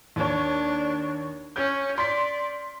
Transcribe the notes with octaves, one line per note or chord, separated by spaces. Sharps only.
D#2 D4 C#5
C#4 G6
D5 C6 B6